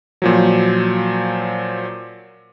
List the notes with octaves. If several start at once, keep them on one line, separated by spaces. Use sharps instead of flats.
A#2 F3 F#3